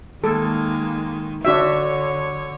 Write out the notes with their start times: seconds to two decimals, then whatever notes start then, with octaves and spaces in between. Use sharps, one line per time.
0.24 D#3 G#3 A#3 A4
1.45 D3 D4 F#4 C#5 E5